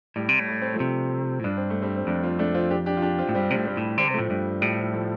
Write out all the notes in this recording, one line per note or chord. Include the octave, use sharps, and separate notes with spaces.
A2 G3
C3
A2
A3
C4
F3 A3
C3
A2
G2 D4
C4
A3
G3 C4
C4
F2 A3 D4
C4 F4
A3 D4
C4 F4
D4 G4
D4 G4
F4
D4 G4
C4 F4
A2
G2 G3 C4
C3 G3 C4
A2
G2 G3 C4
A2
D3 G3 C4
C3 C4
F3 A3
A2
G2 G3
A2 G3
F3
F3 A3